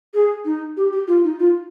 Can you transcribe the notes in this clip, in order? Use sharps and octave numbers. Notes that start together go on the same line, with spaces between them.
G#4
D#4
G4
G4
F4
D#4
F4